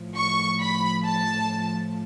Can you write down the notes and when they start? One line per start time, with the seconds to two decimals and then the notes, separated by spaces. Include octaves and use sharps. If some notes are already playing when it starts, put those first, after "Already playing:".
Already playing: A2 F3
0.16 C#6
0.60 B5
1.04 A5